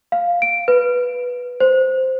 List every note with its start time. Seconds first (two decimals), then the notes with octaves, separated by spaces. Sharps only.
0.12 F5
0.42 D7
0.68 B4
1.60 C5